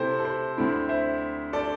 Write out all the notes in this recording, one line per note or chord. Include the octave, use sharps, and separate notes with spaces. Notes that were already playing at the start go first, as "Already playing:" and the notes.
Already playing: C3 A3 C4 E4 A4 C5
A4
C5
D2 D3 C4 E4
C5 E5
A4 D5